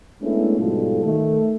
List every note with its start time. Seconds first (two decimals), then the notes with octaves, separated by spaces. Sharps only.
0.22 G#3 A3 B3 C#4 D4 E4
0.59 G#2 B2 F3 G3 F4 A4
1.05 D#3 A3